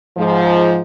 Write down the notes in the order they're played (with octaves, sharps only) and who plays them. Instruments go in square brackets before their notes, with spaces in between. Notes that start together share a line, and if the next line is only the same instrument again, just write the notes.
[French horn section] G#2 F3